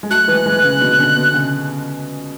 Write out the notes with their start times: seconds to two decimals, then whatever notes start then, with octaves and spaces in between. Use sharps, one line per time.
0.03 G#3
0.10 F#3 A3 F#6
0.28 E3 G#3
0.46 E3 G#3
0.63 C#3 E3
0.81 B2 D3
0.99 B2 D3
1.16 B2
1.34 C#3